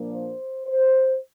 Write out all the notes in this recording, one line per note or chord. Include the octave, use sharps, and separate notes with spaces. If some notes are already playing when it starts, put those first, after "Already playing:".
Already playing: A#2 F3 A#3 D4
C5
C5